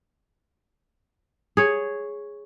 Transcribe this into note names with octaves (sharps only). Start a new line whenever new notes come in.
G#4 C#5